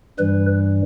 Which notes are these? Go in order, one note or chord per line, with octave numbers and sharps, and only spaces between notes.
G2 E3 G3 B4